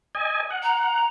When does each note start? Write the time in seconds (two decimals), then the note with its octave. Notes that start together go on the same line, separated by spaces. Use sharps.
0.15 D#5 G#5
0.50 F#5
0.63 A#5